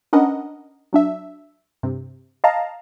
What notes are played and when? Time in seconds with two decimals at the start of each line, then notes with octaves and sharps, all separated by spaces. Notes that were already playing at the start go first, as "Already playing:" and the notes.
0.13 C#4 D4 A#4 B4 D#5 F#5
0.93 F#3 D4 E5
1.83 G2 C3
2.44 D#5 F5 A5 A#5